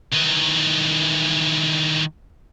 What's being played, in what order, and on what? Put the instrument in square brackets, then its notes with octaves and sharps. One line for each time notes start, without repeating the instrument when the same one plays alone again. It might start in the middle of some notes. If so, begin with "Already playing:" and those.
[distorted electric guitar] D#3 E3